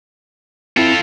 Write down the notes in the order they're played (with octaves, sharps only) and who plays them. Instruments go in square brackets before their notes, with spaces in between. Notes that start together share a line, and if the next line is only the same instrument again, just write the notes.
[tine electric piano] C4 E4 [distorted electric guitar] F4 A4